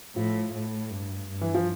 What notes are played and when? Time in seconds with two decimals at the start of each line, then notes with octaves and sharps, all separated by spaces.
0.15 A2 F3
0.53 A2
0.90 G2
1.29 G2
1.41 E3
1.54 F3